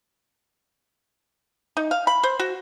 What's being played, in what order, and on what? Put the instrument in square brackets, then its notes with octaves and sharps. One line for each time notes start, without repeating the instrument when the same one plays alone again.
[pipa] D#4
F5
B5
C5
F#4